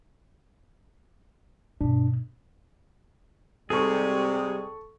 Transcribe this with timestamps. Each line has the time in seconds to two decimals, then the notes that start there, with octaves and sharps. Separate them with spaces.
1.81 G2 B2 D4
3.70 G#2 C3 G3 G#4 A4 C#6